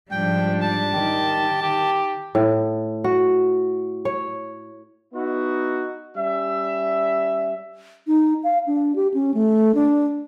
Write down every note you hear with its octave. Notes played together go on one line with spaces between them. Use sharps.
G#2 F3 G3 D4 G5
A5
D#3 G4
G4
A2
F#4
C#5
B3 D#4 E4 F#4
G3 C#4 E5
D#4
F5
D4
G4
C#4
A3
D4